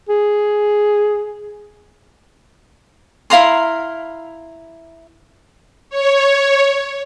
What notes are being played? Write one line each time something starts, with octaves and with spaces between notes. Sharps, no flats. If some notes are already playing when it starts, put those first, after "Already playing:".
G#4
E4 F5 A#5 C6
C#5